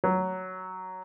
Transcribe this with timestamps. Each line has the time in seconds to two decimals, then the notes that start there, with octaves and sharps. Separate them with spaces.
0.04 F#3